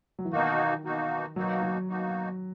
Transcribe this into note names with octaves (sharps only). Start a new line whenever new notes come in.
F#3
E3
B2 D#3 A#3 D#4 F#4
B2 A#3 D#4 F#4
B2 F#3 A#3 D#4 F#4
F#3
B2 A#3 D#4 F#4